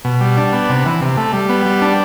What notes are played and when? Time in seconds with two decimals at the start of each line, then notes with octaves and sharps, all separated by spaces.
0.05 B2
0.20 G3
0.37 D4
0.53 B3
0.69 C3
0.86 E3
1.02 C3
1.17 A3
1.33 G3
1.49 B3
1.66 G3
1.82 D4